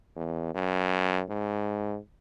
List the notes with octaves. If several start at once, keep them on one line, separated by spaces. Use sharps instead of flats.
E2
F#2
G#2